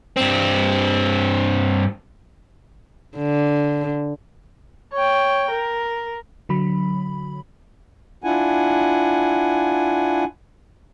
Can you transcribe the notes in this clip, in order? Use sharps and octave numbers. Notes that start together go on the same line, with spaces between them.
G2 C4
D3
C#5 G5
A#4
D3 F#3 B5
D4 E4 F4 F#5 G#5